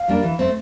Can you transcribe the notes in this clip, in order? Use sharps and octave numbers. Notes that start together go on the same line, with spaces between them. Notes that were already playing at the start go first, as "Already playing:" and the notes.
Already playing: F5
G3 A#3 D4
E3
A3 C4